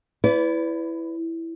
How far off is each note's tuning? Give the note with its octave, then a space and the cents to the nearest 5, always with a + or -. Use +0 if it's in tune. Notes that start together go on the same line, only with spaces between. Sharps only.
E4 +0 B4 +20 D5 -35